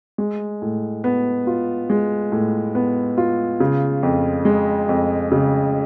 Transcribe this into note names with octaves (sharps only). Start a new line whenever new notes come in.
G#3
A2
B3
F4
G#3
A2
B3
F4
C#3
F2
G#3
F2
C#3